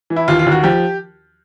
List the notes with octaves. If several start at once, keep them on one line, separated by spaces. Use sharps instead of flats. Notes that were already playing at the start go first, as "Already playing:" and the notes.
E3
E4
D#2 F4
F4
D#2
F#4
F3 G4